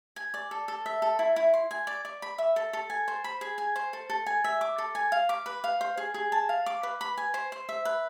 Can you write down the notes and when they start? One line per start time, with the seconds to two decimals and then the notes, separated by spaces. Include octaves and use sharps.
0.16 G#5
0.34 D5
0.51 A4
0.68 A4
0.86 E5
1.02 A4
1.19 E4
1.36 E4
1.54 C6
1.71 G#5
1.87 D5
2.05 D5
2.22 B5
2.38 E5
2.56 A4
2.73 A4
2.90 G#5
3.08 C5
3.24 B5
3.41 G#4
3.58 G#5
3.76 C5
3.93 A4
4.10 A4
4.26 G#5
4.44 E5
4.61 D6
4.78 A4
4.95 G#5
5.12 F5
5.29 D6
5.46 B4
5.64 F5
5.81 C5
5.97 G#4
6.14 G#4
6.32 A5
6.49 F5
6.66 D6
6.83 B4
7.01 B5
7.17 G#5
7.34 C5
7.52 C5
7.69 E5
7.85 B4